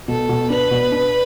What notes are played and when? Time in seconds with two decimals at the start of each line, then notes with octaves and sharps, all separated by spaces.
0.08 B2 A4
0.29 B2
0.50 D4 B4
0.71 B2
0.92 D4